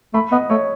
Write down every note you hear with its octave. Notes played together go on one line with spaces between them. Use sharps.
A3 B5
B3 D#5
A3 C#5